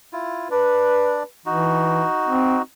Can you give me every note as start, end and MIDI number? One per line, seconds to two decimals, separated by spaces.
0.13 0.48 64
0.13 0.48 65
0.51 1.23 62
0.51 1.24 71
0.51 1.23 74
1.46 2.04 52
1.46 2.62 63
1.46 2.62 66
2.29 2.59 60